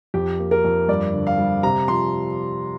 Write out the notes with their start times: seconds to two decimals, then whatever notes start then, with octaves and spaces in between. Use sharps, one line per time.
0.14 F2 G4
0.40 A#3
0.51 A#4
0.64 F2
0.88 G2 D5
1.13 D3
1.27 F5
1.38 G3
1.63 C3 A#5
1.88 F3 C6